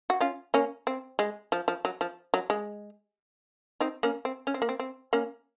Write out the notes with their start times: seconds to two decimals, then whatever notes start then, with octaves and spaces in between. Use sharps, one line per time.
0.10 F#4
0.20 C#4 F4
0.54 A#3 C#4
0.87 C4
1.19 G#3
1.52 F3
1.68 F3
1.85 F#3
2.01 F3
2.34 F#3
2.50 G#3
3.80 C4 D#4
4.03 A#3 C#4
4.25 C4
4.47 C#4
4.54 C4
4.62 A#3
4.69 C4
4.79 C4
5.13 A#3 C#4